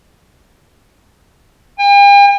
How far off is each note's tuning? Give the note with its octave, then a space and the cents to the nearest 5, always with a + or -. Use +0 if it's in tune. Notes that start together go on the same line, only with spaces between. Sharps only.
G5 +45